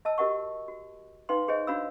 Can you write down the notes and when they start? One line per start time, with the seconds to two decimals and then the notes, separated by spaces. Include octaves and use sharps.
0.05 D#5 A5 E6
0.18 F#4 G4 A#4 D#5 F#5 C#6
0.68 F#4
1.29 D#4 B4 F5 G5 C6
1.48 G#4 C5 C#5 D#5 G#5
1.67 D4 F#4 C#5 F5 B5 E6